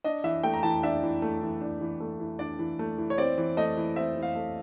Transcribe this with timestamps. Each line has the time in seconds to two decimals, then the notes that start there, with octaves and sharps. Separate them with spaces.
0.04 D4 D#5
0.24 E3 E5
0.43 A3 G5
0.54 A#5
0.63 E3 A5
0.83 D4 E5
1.03 E3
1.22 A3
1.42 E3
1.61 D4
1.81 E3
2.00 A3
2.20 E3
2.39 D4 D5
2.59 E3
2.79 A3
2.98 E3
3.10 C#5
3.18 C4 D5
3.38 E3
3.57 A3 D#5
3.77 E3
3.96 C4 E5
4.16 E3
4.22 F5
4.35 A3